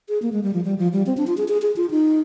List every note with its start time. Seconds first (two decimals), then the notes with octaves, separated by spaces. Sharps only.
0.09 G#4
0.22 A#3
0.33 G#3
0.43 G3
0.53 F3
0.64 G3
0.78 F3
0.93 G3
1.06 C4
1.17 D4
1.27 F4
1.38 G#4
1.48 G#4
1.62 G#4
1.76 F4
1.91 D#4